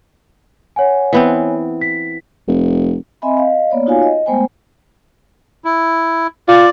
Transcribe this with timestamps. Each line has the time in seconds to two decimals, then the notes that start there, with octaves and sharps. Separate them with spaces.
0.76 C#5 F#5 G#5
1.13 E3 B3 C4
1.81 B6
2.47 F1
3.22 C4 D#5 E5 G#5 B5
3.37 D#5 F5
3.70 A#3 B3 C#5 D5
3.86 D#4 F4 F#4 C#5 F5 G#5
4.02 D#5
4.26 G#3 A3 B3 C5 G5 G#5
5.65 E4
6.48 F4 D5